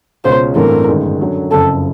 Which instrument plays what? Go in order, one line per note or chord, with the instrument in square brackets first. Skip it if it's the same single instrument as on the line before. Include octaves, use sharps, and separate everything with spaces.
[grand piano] C#2 B2 G#3 C#4 F4 [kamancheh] C5
[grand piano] A1 G2 E3 A3 C4 [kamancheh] A#4
[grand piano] G1 F#2 D#3 G#3
F#2 D3 F#3
[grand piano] F#1 F2 C#3 [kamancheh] A4